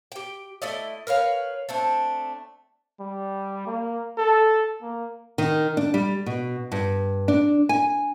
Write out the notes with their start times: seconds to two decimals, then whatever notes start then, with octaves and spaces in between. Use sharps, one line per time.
0.12 G4 G5
0.62 A3 E4 D5 D#5
1.07 A#4 B4 C#5 F5
1.69 A3 C4 D4
3.00 G3
3.67 A#3
4.18 A4
4.82 A#3
5.38 D#3
5.77 D4
5.94 G3
6.26 B2
6.72 G2
7.28 D4
7.69 G#5